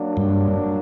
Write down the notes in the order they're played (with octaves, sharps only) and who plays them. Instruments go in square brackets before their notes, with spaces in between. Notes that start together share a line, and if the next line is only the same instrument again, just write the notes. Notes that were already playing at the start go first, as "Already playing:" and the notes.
Already playing: [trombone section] F#3 A#3 D4
[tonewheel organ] G2